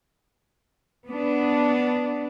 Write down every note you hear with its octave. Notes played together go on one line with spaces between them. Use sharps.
B3 D4